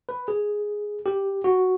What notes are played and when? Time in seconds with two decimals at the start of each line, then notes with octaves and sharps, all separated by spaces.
0.09 B4
0.28 G#4
1.06 G4
1.44 F#4